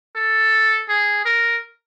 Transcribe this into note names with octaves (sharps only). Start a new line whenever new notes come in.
A4
G#4
A#4